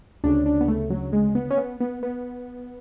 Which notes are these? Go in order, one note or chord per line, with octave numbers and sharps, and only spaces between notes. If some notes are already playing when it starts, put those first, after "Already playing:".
D2 C#3 D4
D4
B3
A3
F#3
G#3
B3
C#4
B3
B3
B3